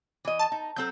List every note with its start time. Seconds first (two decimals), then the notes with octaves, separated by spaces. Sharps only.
0.25 E3 D#5
0.39 A5
0.52 D#4
0.76 F#3 C4 A4 G6